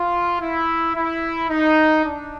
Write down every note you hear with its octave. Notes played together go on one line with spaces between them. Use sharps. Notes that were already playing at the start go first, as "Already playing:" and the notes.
Already playing: F4
E4
E4
D#4
D4